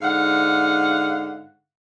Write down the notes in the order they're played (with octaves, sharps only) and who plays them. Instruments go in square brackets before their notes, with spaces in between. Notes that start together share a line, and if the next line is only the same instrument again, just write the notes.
[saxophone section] G#2 D3 F5 F#5